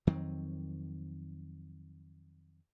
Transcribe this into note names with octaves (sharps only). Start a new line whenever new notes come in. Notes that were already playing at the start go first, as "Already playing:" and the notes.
F2 D#3 F#3 C4